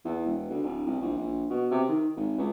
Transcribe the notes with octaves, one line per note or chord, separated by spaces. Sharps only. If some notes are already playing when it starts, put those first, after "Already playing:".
E2
E1
D2
D1
C2
A#1
A#1
B2
C3
D#3
G#1
C#2